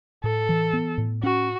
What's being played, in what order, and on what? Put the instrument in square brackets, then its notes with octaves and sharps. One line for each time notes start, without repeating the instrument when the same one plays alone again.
[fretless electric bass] A2 [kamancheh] A4
[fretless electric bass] E3
B3
A2
[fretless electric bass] C#4 [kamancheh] F#4